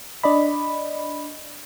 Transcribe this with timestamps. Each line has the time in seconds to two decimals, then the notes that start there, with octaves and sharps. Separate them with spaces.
0.23 D4 D5 D#5 B5